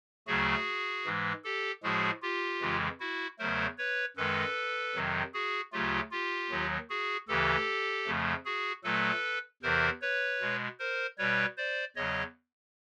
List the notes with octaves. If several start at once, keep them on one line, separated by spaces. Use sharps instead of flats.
D2 C#3 F#3 A3 F#4 G#4
G#2 E3 G#3
G4 A4
A2 F3 G#3 F#4 G#4
F4 G4
F2 C#3 E3 G#3
E4 F#4
E2 C#3 F#3 A3 A#4 C5
B4 C#5
F#2 D#3 G#3 A4 B4
F2 C3 D#3 F#3
F#4 G#4
D2 C#3 F#3 A3 F4 G4
F4 G4
D#2 D#3 F#3
F#4 G#4
D2 C#3 E3 G4 A4
F2 C#3 F3 A3
F#4 G#4
A#2 F#3 A3 A4 B4
E2 C3 E3 A#4 C5
B4 C#5
B2 G#3
A#4 C5
B2 G3 B4 C#5
C5 D5
E2 C#3 F#3 C#5 D#5